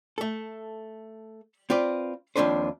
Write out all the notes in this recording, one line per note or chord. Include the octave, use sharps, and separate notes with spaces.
A3 A4
C4 F4 B4 D5
D#2 F3 C4 D4 B4 C5